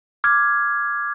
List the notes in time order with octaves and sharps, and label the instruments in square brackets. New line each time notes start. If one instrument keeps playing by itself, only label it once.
[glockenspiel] D6 F6 G#6